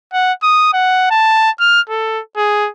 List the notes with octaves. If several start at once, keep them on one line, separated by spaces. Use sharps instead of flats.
F#5
D#6
F#5
A5
F6
A4
G#4